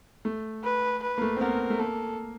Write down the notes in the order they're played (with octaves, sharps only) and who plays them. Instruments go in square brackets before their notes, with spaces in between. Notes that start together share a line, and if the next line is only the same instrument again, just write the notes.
[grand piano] A3
[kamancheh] B4
B4
[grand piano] A#3
A3
C4
[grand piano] B3 [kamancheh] A#4
[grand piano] A3
[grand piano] A#3 [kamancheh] A4